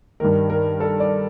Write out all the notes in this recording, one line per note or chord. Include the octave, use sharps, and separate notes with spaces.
G2 D#3 A#4
A#4
A4
D5